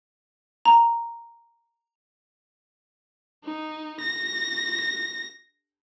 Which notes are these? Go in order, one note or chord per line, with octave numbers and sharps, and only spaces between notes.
A#5
D#4
A#6